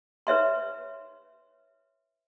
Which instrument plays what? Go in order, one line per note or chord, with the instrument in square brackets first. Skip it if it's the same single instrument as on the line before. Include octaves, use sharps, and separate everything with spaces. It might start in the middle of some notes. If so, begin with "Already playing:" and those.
[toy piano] B4 C#5 E5 C6